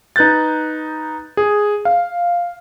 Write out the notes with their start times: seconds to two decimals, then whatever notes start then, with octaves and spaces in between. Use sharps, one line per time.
0.16 D#4 B4 F#6 G6 A6
1.37 G#4
1.85 F5